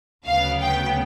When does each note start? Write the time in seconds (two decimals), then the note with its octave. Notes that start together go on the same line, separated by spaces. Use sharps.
0.25 D2 C#3 F#3 B3 F5
0.60 G5